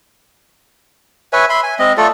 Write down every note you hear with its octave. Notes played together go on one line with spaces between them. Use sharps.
B4 C#5 E5 G#5
E5 B5 C6
G#5
G#3 C4 D#5
A3 F4 A4 D5